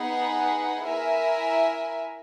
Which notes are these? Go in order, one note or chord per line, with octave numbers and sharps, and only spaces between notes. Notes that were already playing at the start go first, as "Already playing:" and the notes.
Already playing: B3 D#4 G#4 B4 F#5
E4 A#4 E5 G#5